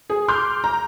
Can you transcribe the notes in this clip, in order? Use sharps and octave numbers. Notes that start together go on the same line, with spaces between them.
G#4
C6 D6 F6 G6
A#5